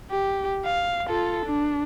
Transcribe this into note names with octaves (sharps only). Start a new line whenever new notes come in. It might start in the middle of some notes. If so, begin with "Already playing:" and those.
G4
F5
F4 A4
D4